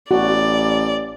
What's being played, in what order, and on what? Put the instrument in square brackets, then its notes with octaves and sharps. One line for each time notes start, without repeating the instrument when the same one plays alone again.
[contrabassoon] A1 [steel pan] F#4 [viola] D5